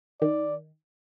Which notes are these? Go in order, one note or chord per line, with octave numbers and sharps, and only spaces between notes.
D#3 D5